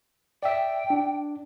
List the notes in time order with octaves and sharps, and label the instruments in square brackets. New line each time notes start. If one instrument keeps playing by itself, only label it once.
[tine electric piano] D5 E5 [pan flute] G5
[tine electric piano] D4